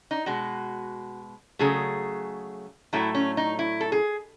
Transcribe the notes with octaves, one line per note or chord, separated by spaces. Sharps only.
D#4
B2 G#3 F#4
C#3 F#3 A3 G#4
A2 F#3 A3 E4
C#4
D#4
E4
A4
G#4